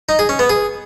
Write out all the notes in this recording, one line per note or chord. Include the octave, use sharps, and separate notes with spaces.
D#4
G#4
C#4
B3
G#4